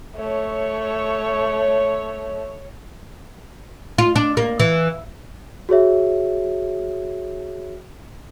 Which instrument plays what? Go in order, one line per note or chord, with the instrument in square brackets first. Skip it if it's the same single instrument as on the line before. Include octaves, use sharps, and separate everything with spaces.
[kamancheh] A3 [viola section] C#5
[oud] F4
D4
A#3
E3
[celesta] F#4 G#4 C#5 E5